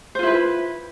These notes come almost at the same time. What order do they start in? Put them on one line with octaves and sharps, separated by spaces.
C5 F4 E4 B4